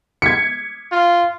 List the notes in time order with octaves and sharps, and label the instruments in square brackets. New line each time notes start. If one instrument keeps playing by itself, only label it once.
[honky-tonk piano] G#6 B6 C#7
[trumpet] F4